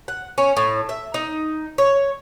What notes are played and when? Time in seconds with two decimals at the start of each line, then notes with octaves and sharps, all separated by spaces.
0.08 F#5
0.38 C#4
0.57 A2
0.89 E5
1.14 D#4
1.78 C#5